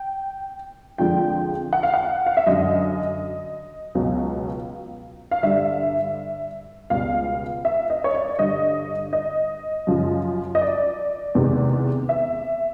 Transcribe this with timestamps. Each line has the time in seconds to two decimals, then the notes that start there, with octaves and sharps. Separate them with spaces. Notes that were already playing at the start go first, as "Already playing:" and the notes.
Already playing: G5
0.98 F2 D3 F3 G#3 G5
1.73 F#5
1.83 F5
1.94 F#5
2.26 F5
2.37 E5
2.47 F#2 D3 F#3 D#5
3.95 C#2 B2 F#3
5.31 F5
5.43 G2 D3 G3 E5
6.90 C#2 B2 G3 F5
7.65 E5
7.90 D#5
8.04 C#5
8.14 D5
8.39 G2 D3 G3 D#5
9.13 D#5
9.87 F#2 C#3 F3
10.55 D#5
10.61 D5
11.35 E2 C3 D#3 G#3
12.09 E5